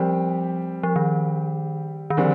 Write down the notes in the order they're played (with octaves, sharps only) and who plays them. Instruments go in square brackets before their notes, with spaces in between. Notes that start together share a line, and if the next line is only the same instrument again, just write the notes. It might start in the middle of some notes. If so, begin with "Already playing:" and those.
Already playing: [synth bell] F3 [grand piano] G3 C4 G4
[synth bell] F3
D#3
D#3
[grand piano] D3 G3 C4 [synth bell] F3